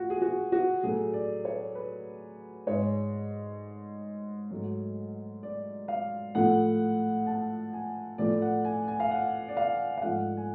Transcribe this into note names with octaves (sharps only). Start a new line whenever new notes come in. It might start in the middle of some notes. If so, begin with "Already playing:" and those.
Already playing: A2 F4 F#4
G#4
F#4
F#4
A2 F#3 A3 G#4
D5
C#5
B4
G#2 G#3 C#5
G#2 F#3 A3
D5
F5
A2 F3 A3 F#5
A5
G#5
A2 F3 A3 D5
F#5
G#5
G#5
F5
F#5
D5
F5
F5
G#2 F3 A3 F#5
G#5